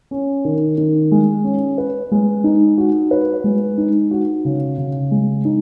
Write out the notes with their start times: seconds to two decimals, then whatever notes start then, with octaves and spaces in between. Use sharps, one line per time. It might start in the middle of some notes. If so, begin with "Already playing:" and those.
0.11 C#4
0.45 D#3
0.78 D#3
1.12 G#3
1.44 C#4
1.78 B4
2.12 G#3
2.44 D#4
2.78 F#4
3.11 B4
3.44 G#3
3.78 D#4
4.11 F#4
4.45 C#3
4.78 C#3
5.11 G#3
5.45 D#4